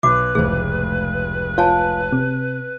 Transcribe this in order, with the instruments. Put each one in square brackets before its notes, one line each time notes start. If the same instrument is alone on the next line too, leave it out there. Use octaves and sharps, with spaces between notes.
[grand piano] B1 [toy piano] F#4 D6 [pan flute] B4
[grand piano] F1 C#2 A2 [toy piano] G#4 C5
[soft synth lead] F4 [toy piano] C#5 G#5 A5
[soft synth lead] C3